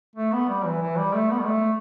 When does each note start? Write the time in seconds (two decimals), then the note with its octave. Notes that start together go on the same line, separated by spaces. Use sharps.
0.15 A3
0.32 B3
0.49 G3
0.65 E3
0.81 E3
0.98 G3
1.14 A3
1.31 B3
1.40 G3
1.47 A3